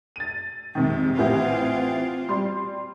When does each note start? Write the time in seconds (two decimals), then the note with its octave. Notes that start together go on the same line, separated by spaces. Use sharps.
0.16 A6 D#7
0.75 F2 C3 D#3 G#3
1.18 A1 E3 C4 F4 G4
2.29 G3 C6